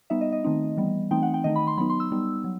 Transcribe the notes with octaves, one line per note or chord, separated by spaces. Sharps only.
G3 B3 D#4 E5
D#5
D#5
D#3 A3 C4 D#4
E3 G3 B3
E3 A3 C4 D#4 G5
F#5
G5
D#3 A3 D#4 D#5
B5
C6
F#3 B3 D#4 B5
C6
E6
G3 B3 D#4
F#3